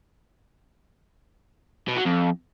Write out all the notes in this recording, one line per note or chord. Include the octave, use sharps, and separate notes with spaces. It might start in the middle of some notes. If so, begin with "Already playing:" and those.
B2
F#3
F2